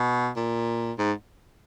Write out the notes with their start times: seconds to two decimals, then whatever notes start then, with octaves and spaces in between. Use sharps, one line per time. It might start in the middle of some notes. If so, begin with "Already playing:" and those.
Already playing: B2
0.36 A#2
0.98 G#2